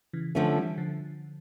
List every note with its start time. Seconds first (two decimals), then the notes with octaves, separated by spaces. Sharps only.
0.13 C#3 E3
0.35 D3 F3 A3 C#4
0.56 E3 G3
0.78 D3 F3